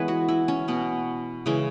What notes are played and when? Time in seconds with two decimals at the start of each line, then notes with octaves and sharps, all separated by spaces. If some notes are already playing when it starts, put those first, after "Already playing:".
Already playing: E3 G#3 B3 B4 C#5
0.08 F#4
0.28 E4
0.48 C#4
0.68 B2 B3
1.46 C#3 E3 G#3 C#4